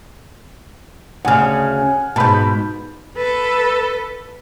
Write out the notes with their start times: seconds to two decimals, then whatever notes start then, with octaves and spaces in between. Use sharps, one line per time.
1.25 D2 C#3 F#5 G#5 F6
2.16 G#2 B2 A5 B5 G6
3.17 A4 B4